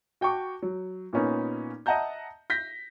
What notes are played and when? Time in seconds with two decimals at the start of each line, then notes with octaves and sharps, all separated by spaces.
0.21 F#4 G5 A5 C#6 D6
0.62 F#3
1.13 A#2 A#3 B3 C#4 D#4
1.86 D#5 E5 F#5 A5 A#5 G6
2.50 G6 A#6 B6